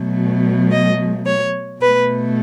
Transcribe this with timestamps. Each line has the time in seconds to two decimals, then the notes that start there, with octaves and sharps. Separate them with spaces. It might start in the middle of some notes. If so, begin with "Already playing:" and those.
Already playing: B2 F#3 A3
0.71 D#5
1.26 C#5
1.81 B2 A3 B4